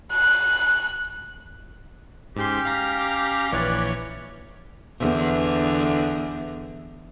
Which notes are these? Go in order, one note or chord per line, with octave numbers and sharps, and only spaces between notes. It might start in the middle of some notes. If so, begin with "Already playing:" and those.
F#6
G#2 C#4 G4 C6
F5 A#5
A#1 E3 B4 C#5 D5
E2 D3